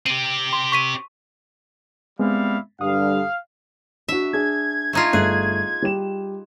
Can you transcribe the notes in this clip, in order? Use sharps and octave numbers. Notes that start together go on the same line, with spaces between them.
C4 G4 D#7 F#7
C6
C#6 B6 D#7
G3 G#3 B3 C4 E4 F5
G2 D3 G3 F5 D#6
D4 F#4 E5
D4 G#4 G#6
A3 D#4 F4
G1 A3 G#4 F#6
G3 G4 E7